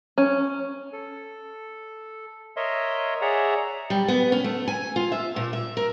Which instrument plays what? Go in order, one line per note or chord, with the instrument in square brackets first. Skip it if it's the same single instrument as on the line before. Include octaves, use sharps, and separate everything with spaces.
[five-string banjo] C#4
[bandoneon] A4
A#4 C#5 D#5 E5 C6
G#4 C#5 D5 E5 F#5 A#5
[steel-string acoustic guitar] G3
B3
C#4
A3
G#5
F4
E5
A#2
E5
A#4